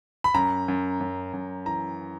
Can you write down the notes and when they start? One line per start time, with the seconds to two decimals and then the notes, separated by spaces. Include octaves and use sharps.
0.24 B5
0.34 F#2 A#5
0.68 F#2
1.00 F#2
1.33 F#2
1.66 E3 A#5